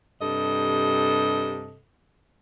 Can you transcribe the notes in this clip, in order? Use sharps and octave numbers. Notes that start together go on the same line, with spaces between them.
G2 C3 A4 D#5